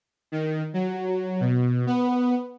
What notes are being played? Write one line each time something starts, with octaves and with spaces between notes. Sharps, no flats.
D#3
F#3
B2
B3